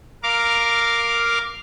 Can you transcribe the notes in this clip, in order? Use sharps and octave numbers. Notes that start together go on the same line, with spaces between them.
A#4 F5 D6 F6